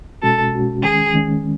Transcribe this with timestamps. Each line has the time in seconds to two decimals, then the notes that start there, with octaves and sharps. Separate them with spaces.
0.22 B2 G#3 C#4 F#4 A4
0.52 B2 G#3 C#4 F#4
0.82 E2 D#3 G#3 C#4 G#4
1.12 E2 D#3 G#3 C#4